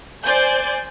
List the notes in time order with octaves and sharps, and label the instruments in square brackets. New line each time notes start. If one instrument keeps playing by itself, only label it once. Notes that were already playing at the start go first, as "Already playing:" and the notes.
[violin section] C5 D5 G#5 G6